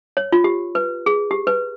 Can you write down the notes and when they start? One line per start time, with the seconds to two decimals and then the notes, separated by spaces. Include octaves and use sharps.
0.17 C#5
0.32 F4
0.44 G4
0.75 B4
1.06 G#4
1.31 G4
1.47 B4